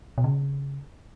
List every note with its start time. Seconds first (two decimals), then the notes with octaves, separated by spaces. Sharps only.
0.18 B2
0.24 C#3